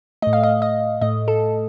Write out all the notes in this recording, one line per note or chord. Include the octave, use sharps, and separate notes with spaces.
A2 A3 D#5
F5
D#5
D#5
A2 A3 D#5
A4